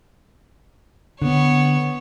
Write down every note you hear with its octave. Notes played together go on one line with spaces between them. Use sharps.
D3 B3 C#5